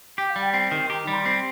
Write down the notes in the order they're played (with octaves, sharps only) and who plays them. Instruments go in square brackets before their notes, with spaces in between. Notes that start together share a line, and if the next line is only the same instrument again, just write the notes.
[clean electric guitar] G4 [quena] G5
[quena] F5
[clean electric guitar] G3
[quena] G5
[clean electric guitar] C4 [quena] G5
[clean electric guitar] D#3
[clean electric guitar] G4 [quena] A#5
[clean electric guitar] G3
[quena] C6
[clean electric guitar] C4